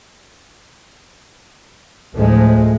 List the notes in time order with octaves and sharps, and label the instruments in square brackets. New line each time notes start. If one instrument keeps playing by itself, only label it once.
[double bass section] D2 A2 F3 G#3 A3